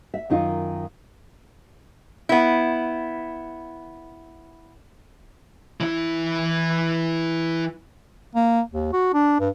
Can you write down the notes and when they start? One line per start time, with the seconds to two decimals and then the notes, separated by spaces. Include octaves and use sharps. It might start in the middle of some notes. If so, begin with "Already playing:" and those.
0.14 E5
0.30 F#2 D#3 D#4 F4
2.29 B3 E4
5.80 E3 E4
8.35 A#3
8.71 D#2
8.93 F#4
9.14 D4
9.40 G2